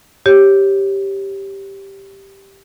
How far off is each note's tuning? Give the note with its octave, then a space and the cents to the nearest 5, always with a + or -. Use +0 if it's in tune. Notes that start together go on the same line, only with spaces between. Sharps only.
G4 +0 C#5 -20